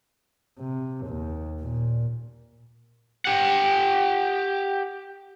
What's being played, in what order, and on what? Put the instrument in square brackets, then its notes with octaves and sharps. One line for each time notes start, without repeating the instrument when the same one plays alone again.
[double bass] C3
D#2
A#2
[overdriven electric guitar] G4 F#5